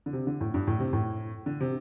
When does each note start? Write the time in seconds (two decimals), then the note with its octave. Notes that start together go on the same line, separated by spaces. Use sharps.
0.06 D3
0.13 C3
0.27 D3
0.41 A2
0.54 G2
0.67 A2
0.79 C3
0.93 A2
1.46 D3
1.60 C3